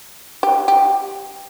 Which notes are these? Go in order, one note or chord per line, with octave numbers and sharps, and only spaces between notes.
G4
G4